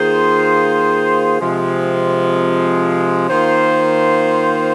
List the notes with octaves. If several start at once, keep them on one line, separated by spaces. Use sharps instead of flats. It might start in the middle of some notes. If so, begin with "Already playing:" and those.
Already playing: D#3 A#3 F4 G#4 C5
C3 F3 G#3
D#3 A#3 F4 C5